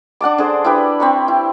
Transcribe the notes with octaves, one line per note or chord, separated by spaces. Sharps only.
D4 F#5 A5 D6
D3 G#4 C5
E4 G4 B4
C4 B5 C#6
E4